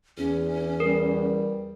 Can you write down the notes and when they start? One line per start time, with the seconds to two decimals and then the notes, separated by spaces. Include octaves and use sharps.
0.17 E2 C#4
0.80 G3 A#4